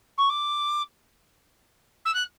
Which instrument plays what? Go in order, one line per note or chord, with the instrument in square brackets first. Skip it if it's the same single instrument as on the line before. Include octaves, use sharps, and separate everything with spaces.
[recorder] C#6
D6
E6
F#6